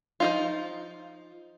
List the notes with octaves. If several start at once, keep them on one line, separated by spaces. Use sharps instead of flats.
F3 D#4 F4